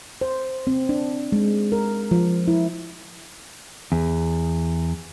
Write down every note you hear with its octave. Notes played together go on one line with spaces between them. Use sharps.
C5
C4
D4
G#3
A#4
F3
E4
E2